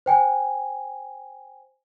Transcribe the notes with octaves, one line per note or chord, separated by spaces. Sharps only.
C5 G5 G#5